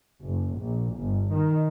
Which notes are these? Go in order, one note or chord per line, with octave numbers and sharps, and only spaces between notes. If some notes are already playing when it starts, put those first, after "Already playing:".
F#1
A#1
G1
D#3